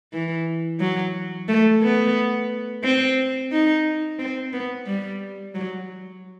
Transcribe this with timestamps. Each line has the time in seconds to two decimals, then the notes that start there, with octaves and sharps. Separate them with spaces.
0.13 E3
0.80 F#3
1.48 A3
1.83 B3
2.84 C4
3.52 D#4
4.19 C4
4.53 B3
4.86 G3
5.55 F#3